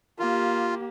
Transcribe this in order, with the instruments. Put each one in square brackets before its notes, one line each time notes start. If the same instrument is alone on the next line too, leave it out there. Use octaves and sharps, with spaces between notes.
[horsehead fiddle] A#3 G4 [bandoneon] F4